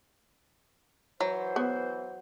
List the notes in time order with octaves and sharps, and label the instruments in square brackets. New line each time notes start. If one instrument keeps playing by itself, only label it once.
[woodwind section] E3 C5 [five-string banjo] F#3
[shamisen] B3